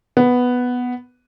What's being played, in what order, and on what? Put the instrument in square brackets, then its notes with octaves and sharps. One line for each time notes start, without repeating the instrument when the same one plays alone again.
[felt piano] B3